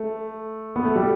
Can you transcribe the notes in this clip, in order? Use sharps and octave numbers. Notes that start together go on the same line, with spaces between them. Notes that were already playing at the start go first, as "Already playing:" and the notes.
Already playing: A3
B3
A3
G3